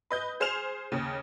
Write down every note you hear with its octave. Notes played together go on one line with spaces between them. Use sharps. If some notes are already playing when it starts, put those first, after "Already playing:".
B4 D#5 G6
G#4 C5 F6 E7 F7
D#2 C#3